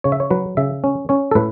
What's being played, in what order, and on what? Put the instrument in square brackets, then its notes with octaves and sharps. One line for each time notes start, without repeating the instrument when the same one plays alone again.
[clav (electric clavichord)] C#3 C#5
E5
C#5
F#3 B4
C#3 E5
C#4
C#4 C#5
A4
A2 B4